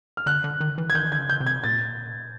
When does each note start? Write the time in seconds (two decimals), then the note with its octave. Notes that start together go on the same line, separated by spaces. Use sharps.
0.17 F6
0.26 D3 F#6
0.44 D3
0.61 D#3
0.78 E3
0.90 G#6
0.95 D#3 G6
1.09 D3 G#6
1.17 C#3
1.29 G6
1.40 C3
1.46 G#6
1.64 A#2 A6